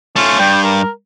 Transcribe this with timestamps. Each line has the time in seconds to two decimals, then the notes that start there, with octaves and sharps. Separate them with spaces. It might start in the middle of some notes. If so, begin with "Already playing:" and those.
0.16 A3 C#4 F4
0.39 G2 G5
0.64 A#4